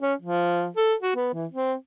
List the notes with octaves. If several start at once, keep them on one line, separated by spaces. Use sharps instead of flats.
C#4
F3
A4
F#4
B3
E3
C4